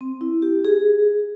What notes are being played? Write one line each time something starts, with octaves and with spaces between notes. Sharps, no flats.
C4
E4
G4
G#4